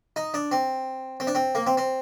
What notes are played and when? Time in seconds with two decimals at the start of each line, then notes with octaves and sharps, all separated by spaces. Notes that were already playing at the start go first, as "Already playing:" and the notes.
0.16 D#4
0.34 D4
0.52 C4
1.20 C4
1.27 D4
1.35 C4
1.55 A#3
1.67 C4
1.77 C4